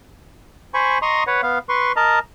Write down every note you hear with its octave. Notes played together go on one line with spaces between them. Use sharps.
C5 G#5 B5 C#6
D#5 A#5 C6 C#6 D#6
B4 C#5 F#5
B3 F5
B4 C6 C#6
A#4 D#5 A5 A#5